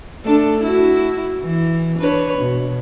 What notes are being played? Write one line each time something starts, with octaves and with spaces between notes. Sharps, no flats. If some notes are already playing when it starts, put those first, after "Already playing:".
A3 D4 A4
E4 F#4
E3
D4 B4 C#5
B2